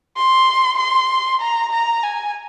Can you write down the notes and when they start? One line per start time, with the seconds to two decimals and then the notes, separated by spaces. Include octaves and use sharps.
0.17 C6
0.79 C6
1.41 A#5
1.72 A#5
2.03 G#5